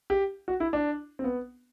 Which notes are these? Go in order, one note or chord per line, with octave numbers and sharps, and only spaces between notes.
G4
F#4
E4
D4
C4
B3